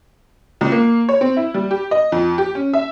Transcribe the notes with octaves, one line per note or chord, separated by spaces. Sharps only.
C#2
A#3
C#5
C4
E4
G3
G4
D#5
F2
G4
C#4
E5